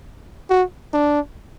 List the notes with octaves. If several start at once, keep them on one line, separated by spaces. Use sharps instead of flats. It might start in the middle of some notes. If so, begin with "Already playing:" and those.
F#4
D4